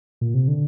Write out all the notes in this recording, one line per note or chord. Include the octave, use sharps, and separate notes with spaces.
A#2
C3
D3